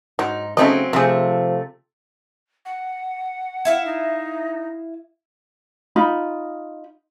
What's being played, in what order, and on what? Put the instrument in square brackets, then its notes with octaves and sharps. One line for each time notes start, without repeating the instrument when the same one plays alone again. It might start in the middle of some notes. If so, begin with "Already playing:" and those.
[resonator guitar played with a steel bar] G#2 D#4 [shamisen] F#3
[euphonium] C#3 [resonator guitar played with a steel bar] F#3 C4 C#4 [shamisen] A3 D#4 D#5
[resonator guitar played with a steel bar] C3 A3 [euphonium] F3 [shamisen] C4 G#4
[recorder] F#5
[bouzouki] E4 E5 F5
[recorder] D#4
[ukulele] D#4 F4 B5